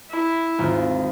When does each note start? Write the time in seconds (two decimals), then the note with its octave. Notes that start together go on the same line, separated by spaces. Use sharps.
0.10 E4
0.58 G#1 D#2 F4